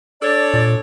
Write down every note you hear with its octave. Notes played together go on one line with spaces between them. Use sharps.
D4 A4 C#5 D5
A#2